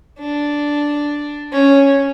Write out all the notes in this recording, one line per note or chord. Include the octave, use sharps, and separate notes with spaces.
D4
C#4